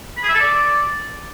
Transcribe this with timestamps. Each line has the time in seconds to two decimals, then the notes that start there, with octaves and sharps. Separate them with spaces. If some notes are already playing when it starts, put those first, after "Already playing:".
0.17 B5
0.23 G#4
0.29 E5
0.35 A4
0.40 D5